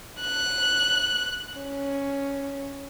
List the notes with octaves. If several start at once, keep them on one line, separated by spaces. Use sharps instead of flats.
F#6
C#4